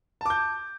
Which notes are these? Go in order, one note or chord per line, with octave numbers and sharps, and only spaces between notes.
A5 D6 G6